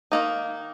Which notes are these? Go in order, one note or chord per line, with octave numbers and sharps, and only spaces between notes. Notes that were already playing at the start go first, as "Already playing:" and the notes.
D#3 A#3 D#4